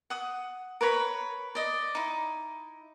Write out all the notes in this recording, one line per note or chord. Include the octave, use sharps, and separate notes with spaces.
F#5 D#6
A#4 B4 C#5 B5
D5 D#5
D#4 E4